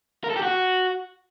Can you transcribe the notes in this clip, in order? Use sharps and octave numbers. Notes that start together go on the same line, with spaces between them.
A#4
A4
G4
F#4